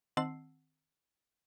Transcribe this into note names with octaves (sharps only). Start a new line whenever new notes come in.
D#3 C4 F#5 A5 E6 C7